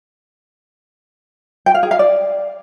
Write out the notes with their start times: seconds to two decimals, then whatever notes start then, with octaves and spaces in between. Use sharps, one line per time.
1.66 G5
1.75 F5
1.83 G#4
1.91 F5
1.99 D5